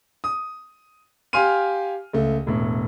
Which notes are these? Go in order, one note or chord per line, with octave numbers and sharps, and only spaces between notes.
D#6
G4 F5 G#5 C6 F6 D#7
C#2 A3
E1 A2